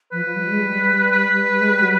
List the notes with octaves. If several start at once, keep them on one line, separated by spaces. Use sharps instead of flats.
F3 B4
F3
G3
G#3
G3
B4
G#3
G3
F#3